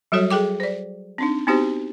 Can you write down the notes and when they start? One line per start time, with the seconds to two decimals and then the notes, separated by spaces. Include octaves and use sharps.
0.12 F#3 G3 F#4 A4 C#5
0.30 G#4 A4 G5 D6
0.60 C5 D5
1.18 C4 D4 D#4
1.47 B3 C4 D#4 F#4 G4 C5